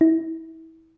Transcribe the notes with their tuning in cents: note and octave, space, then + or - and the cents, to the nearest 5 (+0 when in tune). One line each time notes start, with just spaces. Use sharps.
E4 -30